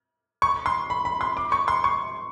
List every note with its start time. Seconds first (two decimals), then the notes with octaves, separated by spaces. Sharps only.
0.42 C#6
0.66 C6
0.90 B5
1.05 B5
1.21 C6
1.37 D6
1.52 C#6
1.68 C6
1.84 C#6